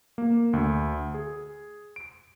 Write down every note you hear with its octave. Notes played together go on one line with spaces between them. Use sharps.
A#3
D2
G#4
D7